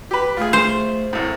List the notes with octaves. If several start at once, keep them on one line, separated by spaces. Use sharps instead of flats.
G4 B4
A3 F4 G#4
C5
C2 A2